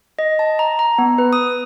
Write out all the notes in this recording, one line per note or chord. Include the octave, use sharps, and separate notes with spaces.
D#5
A5
A#5
A#5
B3
B4
D#6